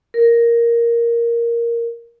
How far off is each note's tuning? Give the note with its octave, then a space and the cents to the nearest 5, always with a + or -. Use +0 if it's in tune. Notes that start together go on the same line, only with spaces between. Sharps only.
A#4 +5